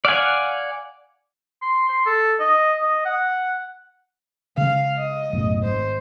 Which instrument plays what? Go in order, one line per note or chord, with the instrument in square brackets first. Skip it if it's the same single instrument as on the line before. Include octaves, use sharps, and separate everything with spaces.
[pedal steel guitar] D5 F5 F#5 G#5
[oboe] C6
C6
A4
D#5
D#5
F#5
[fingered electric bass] C#3 G#3 [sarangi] F5
[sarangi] D#5
[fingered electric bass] B1 F#2 A2
[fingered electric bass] G#1 [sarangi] C5